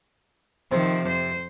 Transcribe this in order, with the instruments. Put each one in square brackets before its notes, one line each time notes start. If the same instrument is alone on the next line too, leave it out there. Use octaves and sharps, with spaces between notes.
[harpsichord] C3 [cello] D#3 F3
[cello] F2 C5